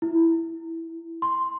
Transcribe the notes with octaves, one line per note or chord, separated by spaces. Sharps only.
E4
C6